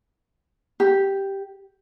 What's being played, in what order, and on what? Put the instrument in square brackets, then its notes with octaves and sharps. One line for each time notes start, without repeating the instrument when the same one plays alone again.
[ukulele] G4